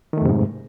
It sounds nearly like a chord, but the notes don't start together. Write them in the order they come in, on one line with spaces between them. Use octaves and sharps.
D#3 A3 F2 C3 G#2